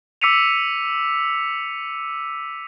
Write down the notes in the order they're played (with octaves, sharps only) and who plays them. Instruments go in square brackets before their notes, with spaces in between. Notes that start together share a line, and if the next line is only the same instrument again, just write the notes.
[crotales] D6 E6 B6 C#7 D#7 F7